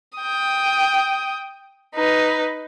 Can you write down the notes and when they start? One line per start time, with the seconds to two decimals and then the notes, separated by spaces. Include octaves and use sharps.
0.18 G5 D#6
1.95 D#4 B4